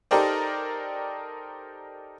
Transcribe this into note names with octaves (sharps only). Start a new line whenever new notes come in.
D#4 G4 A4 A#4 C5 D5